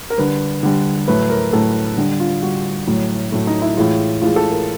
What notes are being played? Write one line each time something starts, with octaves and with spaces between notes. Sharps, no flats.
A#4
D3 G3 B4
D3 G3
A2 F#3 A3 B4
A#4
A2 F#3 A3 A4
D3 G3
F4
D3 G3 F#4
A2 F#3 A3
A2 F#3 A3
D#4
E4
A2 E3 G#3 F4
A2 E3 G#3 F4
A4
A#4